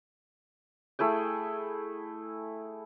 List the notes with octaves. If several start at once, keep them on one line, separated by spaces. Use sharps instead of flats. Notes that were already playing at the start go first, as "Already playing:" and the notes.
A3 E4 G#4 G5